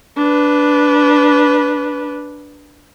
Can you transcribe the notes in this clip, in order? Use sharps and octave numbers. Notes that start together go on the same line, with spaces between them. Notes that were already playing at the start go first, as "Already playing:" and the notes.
D4 B4